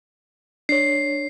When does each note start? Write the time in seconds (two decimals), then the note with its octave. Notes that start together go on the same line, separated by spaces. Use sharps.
0.69 D4 C#5 C7